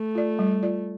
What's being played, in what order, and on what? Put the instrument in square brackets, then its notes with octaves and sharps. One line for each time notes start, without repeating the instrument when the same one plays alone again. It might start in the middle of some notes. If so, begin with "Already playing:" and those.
Already playing: [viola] A3
[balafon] F4 D5
G3
F4 D5